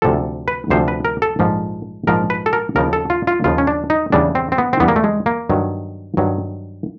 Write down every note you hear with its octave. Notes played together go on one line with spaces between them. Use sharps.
D2 C3 F3 A4
B4
D2 C3 F3 C5
B4
A#4
A4
A#1 G#2 F3
A#1 G#2 F3 A#4
B4
A4
A#4
D#2 C#3 F3 A#4
A4
F4
F4
D#2 C#3 F3 F4
C#4
D4
D#4
E2 C#3 E3 G3 D4
C4
C4
B3
C4
E2 C#3 E3 G3 B3
A#3
A3
G#3
A#3
G2 D#3 F#3
G2 D#3 F#3